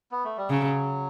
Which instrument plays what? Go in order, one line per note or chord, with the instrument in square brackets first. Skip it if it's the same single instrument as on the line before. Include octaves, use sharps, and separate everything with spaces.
[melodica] B3
A3
G3
[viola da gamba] C#3 [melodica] F#3